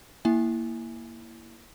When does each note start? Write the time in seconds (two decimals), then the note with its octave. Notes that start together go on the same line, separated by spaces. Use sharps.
0.25 A#3 E4 E5 G#5